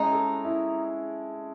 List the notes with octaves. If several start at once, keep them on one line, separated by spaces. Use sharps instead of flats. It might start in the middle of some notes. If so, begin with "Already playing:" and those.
Already playing: G#3 C#4 D#4 E4
A4
E4